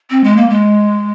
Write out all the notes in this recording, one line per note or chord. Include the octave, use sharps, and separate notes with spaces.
C4
G#3
A#3
G#3